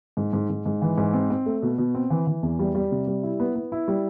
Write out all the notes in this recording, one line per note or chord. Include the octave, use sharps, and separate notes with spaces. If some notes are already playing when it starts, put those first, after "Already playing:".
G#2
G#2
G#2
G#2
E3
G#2
C4
C4
A3
B2
B2
C4
E3
E3
E2
G3
G3
C3
G3
E4
B3
B3
E4
G3